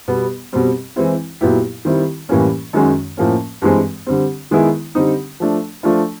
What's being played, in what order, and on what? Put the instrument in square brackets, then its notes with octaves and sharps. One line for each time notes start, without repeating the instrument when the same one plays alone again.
[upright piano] B2 G3 B3
B2 G3 C4
E3 G#3 C4 E4
A#2 F#3 B3 E4 G4
D#3 G3 C4 E4
A2 E3 G3 A#3 C#4
F#2 D#3 G#3 C#4 F#4
A2 F3 A#3 C#4
G2 E3 G#3 C4
D3 G3 C4
D#3 G#3 B3 E4 G#4
D3 G3 C4 D#4
F3 A3 D4
F3 A3 D4 F4